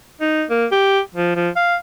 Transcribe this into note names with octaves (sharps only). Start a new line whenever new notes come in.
D#4
A#3
G4
F3
F3
F5